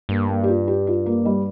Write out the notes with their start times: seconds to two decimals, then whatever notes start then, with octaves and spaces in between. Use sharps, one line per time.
0.09 G2 A#3
0.28 A#3
0.44 G4
0.48 F4
0.67 G4
0.87 F4
1.06 A#3
1.25 G3